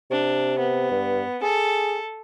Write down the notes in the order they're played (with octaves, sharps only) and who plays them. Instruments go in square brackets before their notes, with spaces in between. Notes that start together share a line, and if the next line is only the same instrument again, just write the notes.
[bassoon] C3 [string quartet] D4
[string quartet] B3
[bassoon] G2
[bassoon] G#4 [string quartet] A4